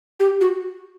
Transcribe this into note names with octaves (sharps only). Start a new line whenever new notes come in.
G4
F#4